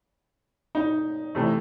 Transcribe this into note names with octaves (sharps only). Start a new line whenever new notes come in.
D#4
C3 E3 A3